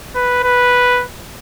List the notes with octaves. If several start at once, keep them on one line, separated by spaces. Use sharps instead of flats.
B4
B4